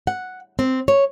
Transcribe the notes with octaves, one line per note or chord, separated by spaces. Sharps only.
F#5
C4
C#5